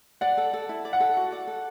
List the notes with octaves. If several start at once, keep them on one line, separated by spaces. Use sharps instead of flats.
D5 F#5
A4
A4
E4
D5
F#5
A4
F#4
D5
A4